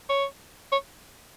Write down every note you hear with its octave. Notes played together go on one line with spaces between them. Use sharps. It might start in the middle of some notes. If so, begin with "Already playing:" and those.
C#5
C#5